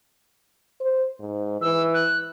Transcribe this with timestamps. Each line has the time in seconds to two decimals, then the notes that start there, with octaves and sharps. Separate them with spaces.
0.81 C5
1.20 G#2
1.61 E3 E6
1.94 F#6